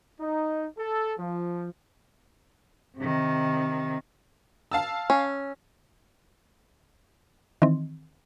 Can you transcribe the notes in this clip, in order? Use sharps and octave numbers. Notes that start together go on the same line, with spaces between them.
D#4
A4
F3
C3 D#3
F5 A5 E6
C#4
D#3 E3 C4